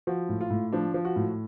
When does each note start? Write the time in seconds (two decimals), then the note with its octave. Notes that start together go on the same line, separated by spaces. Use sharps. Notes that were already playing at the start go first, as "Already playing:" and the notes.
0.07 F3 F#4
0.29 A2
0.41 F4
0.51 A2
0.73 F3 D4
0.94 F3
1.05 F#4
1.16 A2